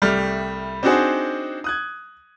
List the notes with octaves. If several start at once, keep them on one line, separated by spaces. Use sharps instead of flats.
C2 G3 A3 F6
C4 D4 D#4 F#4 G#4 C5
D#6 F#6 G#6